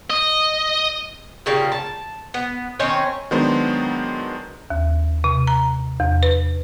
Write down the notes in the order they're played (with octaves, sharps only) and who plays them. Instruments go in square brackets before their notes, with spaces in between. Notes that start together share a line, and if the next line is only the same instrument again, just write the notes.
[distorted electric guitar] D#5
[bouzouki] A#2 C#3 G3 A#3
A5
B3
D#3 C4 C#4 C#5
[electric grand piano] D#3 F#3 G#3 B3 D4 C5
[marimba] D#2
C3
A#5
E2
B4